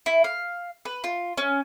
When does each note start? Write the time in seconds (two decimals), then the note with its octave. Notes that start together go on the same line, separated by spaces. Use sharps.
0.06 E4
0.24 F5
0.85 B4
1.04 F4
1.38 C#4